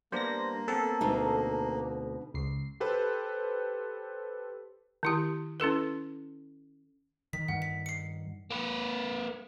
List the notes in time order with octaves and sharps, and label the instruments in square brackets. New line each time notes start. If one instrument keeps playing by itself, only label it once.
[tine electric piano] G3 B3 D4 [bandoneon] A#3 [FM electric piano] C5 A#6
[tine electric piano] B3 C4 [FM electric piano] A4
[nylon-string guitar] D2 B2 D#4
[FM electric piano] C#2 C7
[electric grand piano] G4 A4 B4 C5
[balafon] D#3 E4 G4
C#4 E4 A4 B4
[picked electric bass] D#3 [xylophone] B6
[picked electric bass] G2 D#3 [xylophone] F#5
[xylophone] B6
C7 C#7
[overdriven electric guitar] A#3 B4